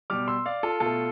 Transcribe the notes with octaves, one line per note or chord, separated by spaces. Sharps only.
B2 G3 D6 F6
C6 E6
D5 F5
F4 A4
B2 A3 F4 A4